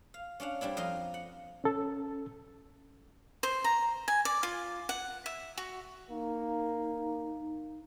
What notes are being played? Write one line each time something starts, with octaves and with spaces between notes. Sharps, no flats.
F5
C#4 D4 F5 F#5
G3 C4 D4 E4
F2 D#5 F5 A#5 C6
F#5
C#4 A4
C5
A#5
G#5
D5
F4
F#5
E5
F#4
A#3 D#4